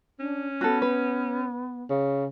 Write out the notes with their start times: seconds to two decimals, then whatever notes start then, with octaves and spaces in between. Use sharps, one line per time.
0.20 C#4 D4
0.61 B3 F#4 A4
0.82 B4
1.90 C#3